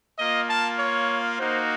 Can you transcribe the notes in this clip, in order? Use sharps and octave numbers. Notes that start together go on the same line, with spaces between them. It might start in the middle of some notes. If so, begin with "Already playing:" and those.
A#3 F4 D#5
A5
C#5
A#3 D#4 F#4 C5